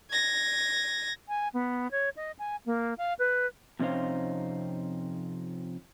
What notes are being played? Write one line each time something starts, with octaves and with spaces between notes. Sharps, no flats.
G#6 A#6
G#5
B3
C#5
D#5
G#5
A#3
F5
B4
F2 C3 C#4 D#4 C5 F5